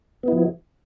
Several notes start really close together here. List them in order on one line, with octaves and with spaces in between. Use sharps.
B3 E4 F3